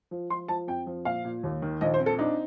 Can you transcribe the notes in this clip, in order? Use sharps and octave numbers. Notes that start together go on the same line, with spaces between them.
F3
F3 C6
F3 A5
F2 G5
F3
A#2 F5
A#2
D#2
D#3
A#1 D#5
C5
C4
A4
D4 D#4